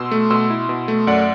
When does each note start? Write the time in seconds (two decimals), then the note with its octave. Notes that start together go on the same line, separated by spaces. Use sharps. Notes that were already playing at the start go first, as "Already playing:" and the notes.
Already playing: B2 C6 E6
0.11 A3
0.30 B2 C6 E6
0.50 E4
0.69 B2
0.88 A3
1.07 F#2 D5 F#5